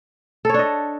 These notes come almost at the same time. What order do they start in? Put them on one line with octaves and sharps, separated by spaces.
A4 C#5 D4 D#5